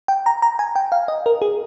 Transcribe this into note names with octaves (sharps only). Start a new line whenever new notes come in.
G5
A#5
A#5
G#5
G5
F5
D#5
A#4
G#4